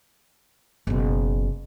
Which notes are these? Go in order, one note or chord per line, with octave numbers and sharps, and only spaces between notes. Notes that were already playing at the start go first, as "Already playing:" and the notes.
F#1 B2